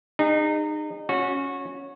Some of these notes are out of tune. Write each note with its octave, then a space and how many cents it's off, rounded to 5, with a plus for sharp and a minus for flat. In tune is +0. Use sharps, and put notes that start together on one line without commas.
D#4 -30 G#4 -35
C#4 +0 F#4 -20